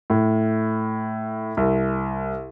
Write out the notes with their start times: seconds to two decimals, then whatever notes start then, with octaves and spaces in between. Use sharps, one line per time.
0.10 A2
1.57 C2